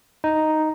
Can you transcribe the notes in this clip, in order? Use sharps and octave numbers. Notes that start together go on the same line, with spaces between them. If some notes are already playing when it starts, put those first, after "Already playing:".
D#4